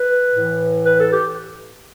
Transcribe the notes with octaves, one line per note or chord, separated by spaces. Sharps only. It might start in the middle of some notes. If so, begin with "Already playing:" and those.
Already playing: B4
A2 E3
B4
A4
G4